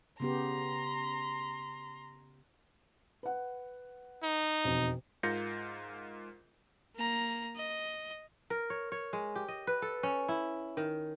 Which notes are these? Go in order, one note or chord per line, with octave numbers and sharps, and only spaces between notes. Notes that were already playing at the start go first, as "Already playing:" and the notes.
C#3 B3 G4 A#5 C6
B4 F#5
D#4
E1 F2
G#2 F4 A#4 G6 A#6 C#7
A#3 A#5
D#5
A#4
C#5
C#5
G#3
G4
D#5
B4
A4
C#4
E4
D#3